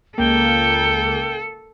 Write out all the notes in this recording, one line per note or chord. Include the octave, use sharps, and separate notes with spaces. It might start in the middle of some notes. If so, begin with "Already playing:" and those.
C#2 A#3 A4 G5